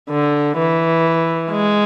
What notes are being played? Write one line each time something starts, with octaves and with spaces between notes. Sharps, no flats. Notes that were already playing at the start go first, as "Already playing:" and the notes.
D3
E3
G#3